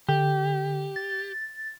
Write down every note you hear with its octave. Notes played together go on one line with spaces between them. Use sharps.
D3 G4
A6